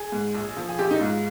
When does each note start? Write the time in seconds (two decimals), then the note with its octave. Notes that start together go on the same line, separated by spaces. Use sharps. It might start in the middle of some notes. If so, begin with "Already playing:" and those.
Already playing: G#4
0.12 G#2
0.35 A#1
0.57 F3
0.69 G#4
0.79 A#1 G4
0.91 D#4
1.01 G#2 F4